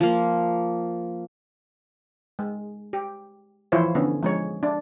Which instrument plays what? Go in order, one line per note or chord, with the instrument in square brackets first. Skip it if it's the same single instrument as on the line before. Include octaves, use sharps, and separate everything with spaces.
[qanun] F3 A#3
[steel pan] G#3
G4
E3 F3 E4 F4 C5 C#5
D3 B3 C#4
F3 G#3 C#5
D4